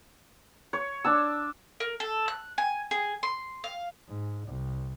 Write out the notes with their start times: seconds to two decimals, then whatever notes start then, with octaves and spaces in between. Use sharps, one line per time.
0.73 C#5
1.04 D4 A5 E6
1.80 A#4
2.00 A4
2.28 F#6
2.58 G#5
2.91 G#4
3.23 C6
3.64 F5
4.09 G#2
4.48 C2